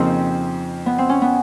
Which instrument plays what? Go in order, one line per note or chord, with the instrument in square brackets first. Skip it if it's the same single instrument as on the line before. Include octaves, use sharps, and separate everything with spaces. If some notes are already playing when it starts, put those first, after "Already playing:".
Already playing: [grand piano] F2 C#3 F3 A#3 D#4 [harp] C4
[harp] B3
C4
C#4
B3